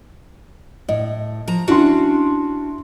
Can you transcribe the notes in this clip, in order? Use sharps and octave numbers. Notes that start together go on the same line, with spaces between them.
A2 D#5
F3 A#5
C#4 D4 E4 F#4 C6